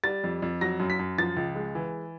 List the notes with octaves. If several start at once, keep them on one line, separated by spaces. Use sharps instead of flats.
G3 A6
F2
F2
F#3 A#6
F#2
B6
F#2
F3 A6
C#2
G#3
E3